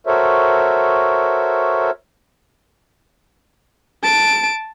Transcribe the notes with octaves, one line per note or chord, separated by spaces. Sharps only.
F#4 A4 A#4 C5 C#5 E5
A5 D7